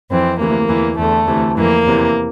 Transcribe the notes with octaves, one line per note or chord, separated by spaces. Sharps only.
F2 E3 C4
D2 C3 E3 A#3
E2 E3
E2 D3 A3
D2 C3 E3
F2 E3 A#3
E2 C3 E3